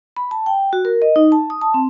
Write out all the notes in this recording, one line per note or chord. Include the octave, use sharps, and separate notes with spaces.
B5
A5
G5
F#4
A#4
D#5
D#4
A5
D#6
A5
C4